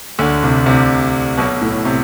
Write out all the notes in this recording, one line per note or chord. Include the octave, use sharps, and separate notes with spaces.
D2 D3
C2 C3
C2 C3
B1 B2
A2
C3